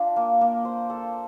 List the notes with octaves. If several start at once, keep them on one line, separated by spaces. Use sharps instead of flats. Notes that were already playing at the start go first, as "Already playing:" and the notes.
Already playing: D4 F4 A#4
A#3
A#3
C5
A4